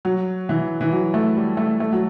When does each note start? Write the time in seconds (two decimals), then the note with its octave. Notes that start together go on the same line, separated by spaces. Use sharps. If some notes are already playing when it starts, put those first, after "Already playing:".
0.05 F#3
0.49 E3
0.81 E3
0.92 F#3
1.14 A3
1.37 G3
1.57 A3
1.80 A3
1.92 F#3